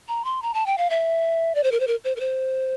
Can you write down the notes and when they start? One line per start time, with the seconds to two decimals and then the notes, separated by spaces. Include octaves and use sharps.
0.08 A#5
0.25 C6
0.42 A#5
0.54 A5
0.66 G5
0.78 F5
0.90 E5
1.55 D5
1.63 C5
1.72 A#4
1.80 C5
1.87 A#4
2.04 C5
2.16 A#4
2.20 C5